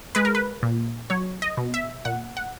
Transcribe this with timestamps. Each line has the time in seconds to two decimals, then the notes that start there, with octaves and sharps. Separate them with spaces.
0.15 G#3 B4
0.25 A#4
0.35 B4
0.63 A#2
1.10 F#3 C#5
1.42 D#5
1.57 B2
1.74 E5
2.05 A#2 F#5
2.37 F#5